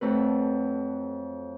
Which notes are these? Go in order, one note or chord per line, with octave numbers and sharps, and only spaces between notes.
F2 F#3 A3 B4